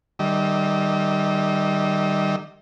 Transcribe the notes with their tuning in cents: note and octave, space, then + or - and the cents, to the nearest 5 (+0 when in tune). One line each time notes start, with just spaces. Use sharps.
D#3 -35 G3 -15 E5 -45